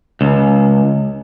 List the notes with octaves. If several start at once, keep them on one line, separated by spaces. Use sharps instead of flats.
C#2